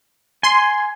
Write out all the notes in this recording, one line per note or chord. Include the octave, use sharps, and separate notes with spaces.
G#5 C6